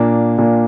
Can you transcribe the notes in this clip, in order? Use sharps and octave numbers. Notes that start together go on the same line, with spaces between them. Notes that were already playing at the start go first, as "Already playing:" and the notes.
Already playing: A#2 A#3 D4
A#2 A#3 D4